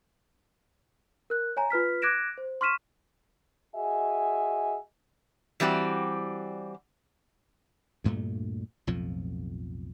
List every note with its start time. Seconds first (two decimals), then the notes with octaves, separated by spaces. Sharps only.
1.30 A#4 F#6
1.57 C#5 G#5 A#5
1.70 F4 B4 F6 B6
2.02 D6 F#6 G#6 A#6 D7 E7
2.38 C5
2.61 C6 C#6 F6 B6 D#7 E7
3.76 F#4 G#4 D#5 E5 G#5
5.60 E3 G3 C4 F#4 D5
8.04 D2 G2 A#2 A3
8.87 B1 F2 A2 F3